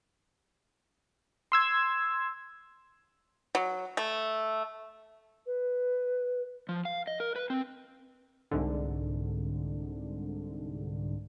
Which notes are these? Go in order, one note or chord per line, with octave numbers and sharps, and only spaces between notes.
C6 E6 G#6
F#3
A3
B4
F3
F5
D#5
A#4
B4
C4
C2 G#2 D3